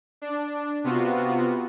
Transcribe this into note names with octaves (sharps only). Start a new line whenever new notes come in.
D4
C3 B3 F4 F#4